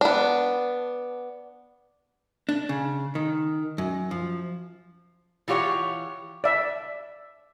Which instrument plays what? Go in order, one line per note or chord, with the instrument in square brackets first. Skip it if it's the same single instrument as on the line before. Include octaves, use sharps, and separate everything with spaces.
[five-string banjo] B3 D4
[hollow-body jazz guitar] D4
C#3
D#3
F#2
F3
[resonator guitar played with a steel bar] E3 F4 G4 C#5 F#5
[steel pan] D5 E5